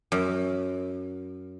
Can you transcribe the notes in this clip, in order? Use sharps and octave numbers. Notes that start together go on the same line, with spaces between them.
F#2